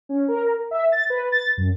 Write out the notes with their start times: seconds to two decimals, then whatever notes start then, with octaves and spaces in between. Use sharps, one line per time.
0.09 C#4
0.28 A#4
0.71 E5
0.92 A6
1.10 B4
1.32 A6
1.57 F#2